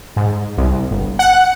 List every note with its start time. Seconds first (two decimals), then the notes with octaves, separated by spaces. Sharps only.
0.16 G#2
0.57 C2
0.91 G1
1.19 F#5